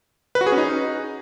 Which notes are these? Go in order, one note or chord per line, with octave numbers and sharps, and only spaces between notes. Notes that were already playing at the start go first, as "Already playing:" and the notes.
B4
F#4
G#4
C#4
D#4